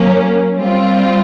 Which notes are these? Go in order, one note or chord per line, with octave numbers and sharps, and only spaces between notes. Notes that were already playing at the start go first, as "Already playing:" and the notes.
Already playing: F#3 A#3 C#4
G3 C4 F4